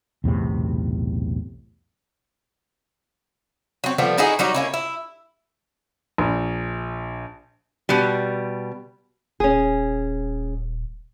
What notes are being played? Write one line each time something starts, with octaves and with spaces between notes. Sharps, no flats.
B1 E2 A2 C3
F#3 C4
F3 G3 A3 B3
D#4 E4 F#4 G#4
F#3 G3 D#4 F#4
A#3 C#4 E4
E4
A#1
B2 G3
D#1 C#4 G#4